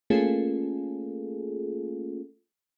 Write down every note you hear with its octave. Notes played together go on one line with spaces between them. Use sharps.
A3 A#3 C#4 F4 G#4 A4